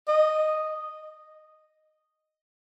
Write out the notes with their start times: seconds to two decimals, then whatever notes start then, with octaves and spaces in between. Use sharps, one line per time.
0.08 D#5